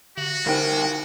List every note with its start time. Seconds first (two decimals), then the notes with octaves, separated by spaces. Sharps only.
0.18 D3 F#4 F#7
0.47 C2 D3 D#4 A#4 C5 G5